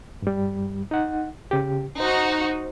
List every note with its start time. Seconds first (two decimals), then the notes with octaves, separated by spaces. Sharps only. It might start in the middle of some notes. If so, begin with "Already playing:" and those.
0.22 G2 G3
0.91 D#4 F#5
1.51 C#3 G4
2.00 D#4 F#4 C5